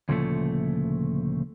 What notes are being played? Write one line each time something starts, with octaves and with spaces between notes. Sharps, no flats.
D2 A#2 C#3 F3 G#3 A3